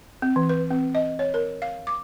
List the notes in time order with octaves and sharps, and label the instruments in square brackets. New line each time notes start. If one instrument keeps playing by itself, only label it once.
[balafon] C4
E3
B4
C4
D#5
C#5
A#4
F5
D6